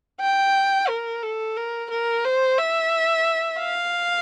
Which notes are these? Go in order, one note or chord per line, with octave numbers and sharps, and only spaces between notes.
G5
A#4
A4
A#4
A#4
C5
E5
F5